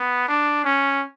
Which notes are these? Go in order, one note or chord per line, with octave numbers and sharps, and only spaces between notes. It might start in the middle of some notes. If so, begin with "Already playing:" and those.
Already playing: B3
D4
C#4